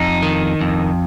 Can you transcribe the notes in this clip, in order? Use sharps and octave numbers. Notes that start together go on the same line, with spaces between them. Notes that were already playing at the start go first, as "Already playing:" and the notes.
Already playing: F2 D#4
D#3
F2